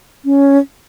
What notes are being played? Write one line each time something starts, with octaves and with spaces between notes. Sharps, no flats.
C#4